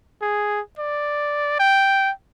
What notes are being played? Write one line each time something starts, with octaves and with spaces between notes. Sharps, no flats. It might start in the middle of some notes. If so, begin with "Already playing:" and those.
G#4
D5
G5